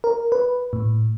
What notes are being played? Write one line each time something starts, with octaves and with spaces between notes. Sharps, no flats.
A#4
B4
A2